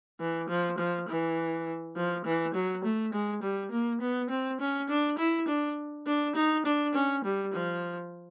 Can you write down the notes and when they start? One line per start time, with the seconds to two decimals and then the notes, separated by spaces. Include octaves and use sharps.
0.20 E3
0.49 F3
0.78 F3
1.08 E3
1.96 F3
2.25 E3
2.54 F#3
2.84 A3
3.13 G#3
3.42 G3
3.71 A#3
4.01 B3
4.30 C4
4.60 C#4
4.89 D4
5.18 E4
5.48 D4
6.07 D4
6.36 D#4
6.66 D4
6.95 C#4
7.24 G3
7.54 F3